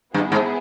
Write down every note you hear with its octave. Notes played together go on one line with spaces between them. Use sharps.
G2 B3 E4 G#4
G#2